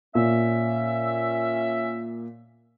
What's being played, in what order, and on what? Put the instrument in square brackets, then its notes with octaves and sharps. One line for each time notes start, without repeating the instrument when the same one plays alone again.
[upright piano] A#2 [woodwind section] C#4 E5